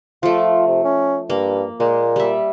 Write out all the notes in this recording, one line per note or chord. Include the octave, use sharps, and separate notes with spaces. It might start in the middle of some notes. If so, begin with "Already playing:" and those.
F3 A3 F4
C3
C#4
G2 A#3
A#2 G#3
G3 E5